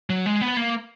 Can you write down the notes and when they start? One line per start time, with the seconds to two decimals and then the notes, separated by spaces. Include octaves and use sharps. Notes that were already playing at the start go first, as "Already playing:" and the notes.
0.10 F#3
0.26 G#3
0.41 B3
0.57 A#3